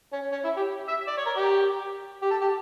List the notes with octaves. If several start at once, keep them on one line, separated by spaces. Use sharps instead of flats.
C#4
C#4
E4
G4
E5
D5
C#5
A#4
G4
G4
A4
G4